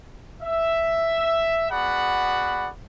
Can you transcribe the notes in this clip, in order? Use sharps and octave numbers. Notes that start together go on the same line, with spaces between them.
E5
B3 F#4 G#4 D5 F#5 B5